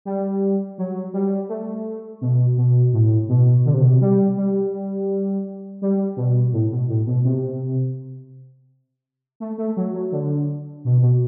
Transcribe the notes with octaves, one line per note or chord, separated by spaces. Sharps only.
G3
F#3
G3
A3
B2
B2
A2
B2
D3
C3
B2
C3
G3
G3
G3
B2
A2
B2
A2
B2
C3
A3
A3
F#3
F#3
D3
B2
B2